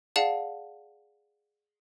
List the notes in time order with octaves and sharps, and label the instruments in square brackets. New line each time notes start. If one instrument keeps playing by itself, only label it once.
[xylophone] G#4 D5 F5 F#5 A5